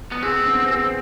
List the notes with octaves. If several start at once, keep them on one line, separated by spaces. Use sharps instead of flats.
B3
C4 G#4
B3
G#4